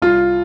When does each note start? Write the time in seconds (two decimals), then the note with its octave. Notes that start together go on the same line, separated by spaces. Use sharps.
0.02 C2 F4